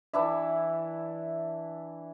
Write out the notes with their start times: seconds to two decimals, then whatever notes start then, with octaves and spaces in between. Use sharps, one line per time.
0.13 E3 D4 E4 E5